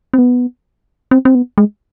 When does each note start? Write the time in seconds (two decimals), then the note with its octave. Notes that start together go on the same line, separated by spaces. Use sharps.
0.14 C4
0.18 B3
1.11 C4
1.25 C4
1.35 B3
1.58 G#3